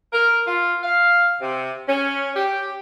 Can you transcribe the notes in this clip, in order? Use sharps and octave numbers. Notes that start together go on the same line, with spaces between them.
A#4
F4
F5
C3
C#4
G4